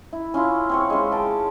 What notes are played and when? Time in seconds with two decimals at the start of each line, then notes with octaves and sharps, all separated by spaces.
0.13 E4
0.34 C#4 E4 F4
0.69 C4 C#5 C#6
0.90 G#3 C#4
1.12 G5 A5